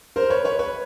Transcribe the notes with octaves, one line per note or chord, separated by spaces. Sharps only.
A#4 C5
B4 C#5
B4 C#5
B4 C#5